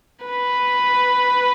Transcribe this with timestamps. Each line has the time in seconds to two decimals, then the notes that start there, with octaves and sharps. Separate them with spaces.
0.25 B4